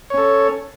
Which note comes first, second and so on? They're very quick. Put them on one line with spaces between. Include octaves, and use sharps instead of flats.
C#5 C#4 A4